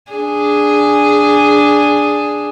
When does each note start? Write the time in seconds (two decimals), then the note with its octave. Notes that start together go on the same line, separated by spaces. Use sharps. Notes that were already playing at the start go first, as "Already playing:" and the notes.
0.12 D4 G#4